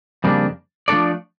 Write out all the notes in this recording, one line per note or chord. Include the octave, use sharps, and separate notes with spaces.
F2 C#3 G3 A#3 D4
F3 A3 D4 A4 D5